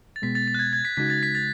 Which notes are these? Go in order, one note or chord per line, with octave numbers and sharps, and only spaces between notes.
A6
B2 G#3 B3 B6
A6
A6
F#6
G#6
G#6
B6
C#3 G#3 D#4 F#4 B6
A6
B6
A6